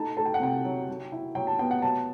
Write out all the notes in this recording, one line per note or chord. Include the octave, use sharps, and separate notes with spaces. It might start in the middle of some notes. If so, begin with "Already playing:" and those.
Already playing: A3 D#4 A5
A3 A5
G5
F#5
C3 G5
F#3
F#3
E4
F#3 G5
A5
B3 G5
F#5
F#3 A5